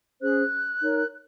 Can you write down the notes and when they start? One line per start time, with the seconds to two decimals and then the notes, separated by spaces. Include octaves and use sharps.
0.21 C#4 G#4 C5 F#6
0.82 D#4 A#4 C#5